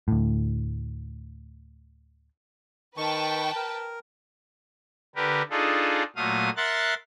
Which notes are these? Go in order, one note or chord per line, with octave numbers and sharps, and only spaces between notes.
D2 A2
D#3 B4 G5 A5 C#6
A#4
D3 G4 A#4 B4
D4 D#4 F4 G#4 A4
A#2 F#3 A3 F5 D#6
A#4 E5 F#5 C6 F#6 A6